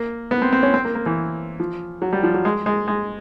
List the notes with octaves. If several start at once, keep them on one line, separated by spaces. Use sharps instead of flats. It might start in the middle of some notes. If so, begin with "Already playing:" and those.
Already playing: A#3
B3
C4
C4
C#4
C4
A#3
A#3
E3
F3
F#3
G3
F3
F#3
G#3
G#3
G#3